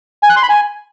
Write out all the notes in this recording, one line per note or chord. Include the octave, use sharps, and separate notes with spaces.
G#5
F#6
C6
B5
G#5